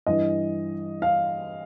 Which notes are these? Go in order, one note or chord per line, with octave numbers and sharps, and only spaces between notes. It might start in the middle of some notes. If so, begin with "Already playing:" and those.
G2 E3 D#5
F5